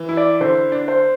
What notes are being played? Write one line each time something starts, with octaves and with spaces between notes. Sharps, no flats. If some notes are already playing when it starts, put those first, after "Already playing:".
Already playing: E3
E4
D5
D3 C5
D4
C5